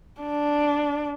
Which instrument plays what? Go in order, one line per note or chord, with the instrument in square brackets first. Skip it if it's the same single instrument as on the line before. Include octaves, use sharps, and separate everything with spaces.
[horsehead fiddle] D4